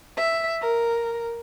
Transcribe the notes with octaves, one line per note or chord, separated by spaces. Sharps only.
E5
A#4